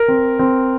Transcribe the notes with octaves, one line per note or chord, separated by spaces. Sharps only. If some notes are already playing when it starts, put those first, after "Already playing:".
Already playing: A#4
C4
C4